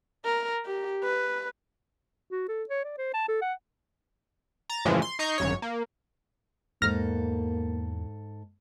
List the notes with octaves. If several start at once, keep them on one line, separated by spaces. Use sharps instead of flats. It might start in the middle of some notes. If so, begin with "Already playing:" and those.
A#4
G4
B4
F#4
A4
C#5
D5
C5
A5
A4
F#5
A#5 A6
F#2 A2 C#3 E3 F3 G#3
C6
D#4 D#5 A#5 C#6 G6 C7
G#1 F#2 C#5
A#3
E2 G#2 A#3 A4 F6 A#6